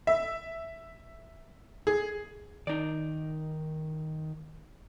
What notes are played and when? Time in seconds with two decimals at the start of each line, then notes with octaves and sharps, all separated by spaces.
0.07 E5
1.87 G#4
2.67 D#3 D#4 D5